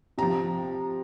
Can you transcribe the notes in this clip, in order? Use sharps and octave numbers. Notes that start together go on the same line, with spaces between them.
C3 F3 A#5